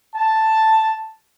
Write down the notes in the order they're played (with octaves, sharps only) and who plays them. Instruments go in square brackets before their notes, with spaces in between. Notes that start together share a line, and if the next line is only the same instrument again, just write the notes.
[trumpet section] A5